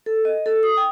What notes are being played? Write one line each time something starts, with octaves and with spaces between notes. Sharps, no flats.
A4
D#5
A4
D#6
G5